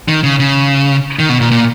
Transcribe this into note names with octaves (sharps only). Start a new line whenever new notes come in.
D#3
C#3
C#3
D#3
B2
A#2
A#2